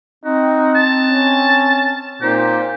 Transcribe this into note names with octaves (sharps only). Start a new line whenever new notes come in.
C4 D#4 F#4
A5
C#4
A#2 C4 D#4 G4 C5